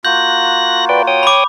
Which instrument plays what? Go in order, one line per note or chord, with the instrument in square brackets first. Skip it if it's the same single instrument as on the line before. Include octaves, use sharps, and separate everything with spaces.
[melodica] A#3 F4 F#4 [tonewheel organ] F#6 A#6 [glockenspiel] G6
[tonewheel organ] B4 D5 G5
C#5 G5 D#6
[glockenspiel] B5 D6